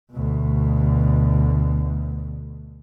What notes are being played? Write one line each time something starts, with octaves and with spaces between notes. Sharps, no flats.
D2 B2